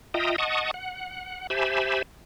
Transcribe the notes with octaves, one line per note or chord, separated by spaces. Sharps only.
F4 D#5 E5 G5 A#5 D#6
D#5 F#5 A5 C#6 D#6
F#5
G4 C5 E5 G#5 A5 B5